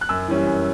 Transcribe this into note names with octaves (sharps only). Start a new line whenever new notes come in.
F#6
F#2 E6
E3 G3 C#4
F#2